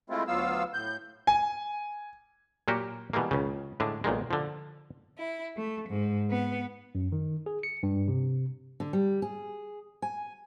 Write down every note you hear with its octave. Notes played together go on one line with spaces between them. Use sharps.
G#3 A3 C4 E4 F4
D2 F#3 B3 F4 F5 E6
A2 G6
G#5
A#2 F#3 A#3 F#4 G4
B2 E3 G3 G#3 A#3
C#2 C#3
A2 D3 G#3 D4
B1 A#2 D#3 G#3
D3 F3
E4
A3
G#2
B3
F#2
D#3
G#4
C#7
G2
C3
D3
G3
G#4
G#5